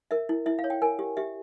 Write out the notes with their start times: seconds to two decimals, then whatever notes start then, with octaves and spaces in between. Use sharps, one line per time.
0.11 A#4 E5
0.29 E4
0.46 E4 E5
0.59 F5
0.64 C#5
0.70 G5
0.82 A#4 G#5
0.99 G4
1.17 G4 E5